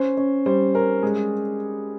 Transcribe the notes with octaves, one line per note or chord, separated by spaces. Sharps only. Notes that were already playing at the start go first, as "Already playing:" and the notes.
Already playing: C#4 C5
C#4
G3 C5
C#4 A#4
G#3 G#4